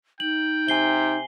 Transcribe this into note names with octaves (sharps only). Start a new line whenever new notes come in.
D#4 G5 F#7
C3 G#5 C7 G7